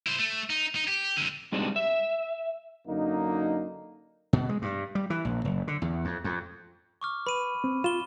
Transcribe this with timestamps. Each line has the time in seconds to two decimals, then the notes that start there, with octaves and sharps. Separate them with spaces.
0.07 E4 C5
0.19 A3
0.50 D#4
0.75 D#4
0.88 G4
1.17 F2 D3
1.52 G3 G#3 C4 D4 D#4 G4
1.76 E5
2.88 F#2 D3 A#3 D#4
4.33 B2
4.49 G#3
4.62 G2
4.95 G3
5.10 E3
5.25 A#1
5.45 F#1
5.68 D3
5.82 E2
6.05 F2
6.24 F2
7.01 C#6 D6 F6
7.27 B4 B5 D#7
7.64 C4
7.84 F4 E7 G7